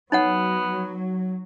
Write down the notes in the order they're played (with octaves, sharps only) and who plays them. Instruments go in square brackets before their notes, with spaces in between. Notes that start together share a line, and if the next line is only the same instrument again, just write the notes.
[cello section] F#3 [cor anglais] B3 [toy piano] D#4 C#5 F#5